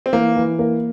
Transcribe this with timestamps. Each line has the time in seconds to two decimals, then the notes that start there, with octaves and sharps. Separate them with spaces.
0.06 C4
0.13 E3 A#3
0.36 E3
0.59 A#3